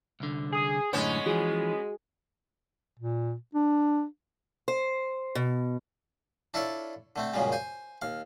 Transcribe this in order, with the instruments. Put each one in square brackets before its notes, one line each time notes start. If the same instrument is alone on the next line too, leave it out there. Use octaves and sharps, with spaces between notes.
[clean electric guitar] C2 D3
[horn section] G#4
[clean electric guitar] F#2 A2 D3 [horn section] G#3 [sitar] B3 C#4
[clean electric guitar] E3 F3 [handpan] F#4 G#4
[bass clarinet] A#2
D4
[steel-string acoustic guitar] C5
B2
[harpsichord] D4 E4 F4 A4 C#5 D5
D3 A3 C4
F#2 A#2 C#3 F3 G3 G#3
C5 G#5
D#2 F5